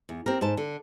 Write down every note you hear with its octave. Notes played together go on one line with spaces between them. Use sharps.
E2
C4 G4 A#4
G#2 C5 A5
D3